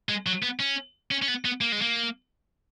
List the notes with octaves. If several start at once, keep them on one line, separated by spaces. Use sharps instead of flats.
G#3
F#3
B3
C#4
C#4
C#4
B3
B3
A#3
G#3
A#3